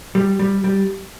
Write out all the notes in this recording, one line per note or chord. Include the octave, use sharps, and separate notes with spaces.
G3
G3
G3